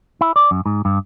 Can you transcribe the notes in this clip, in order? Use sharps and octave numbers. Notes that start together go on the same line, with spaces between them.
E4
D5
F#2
G#2
G2